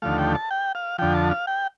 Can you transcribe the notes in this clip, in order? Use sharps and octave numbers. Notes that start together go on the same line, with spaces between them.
D#2 D3 F3 A3 F5
G5
A5
G5
F5
F2 D3 F3 G5
A5
F5
G5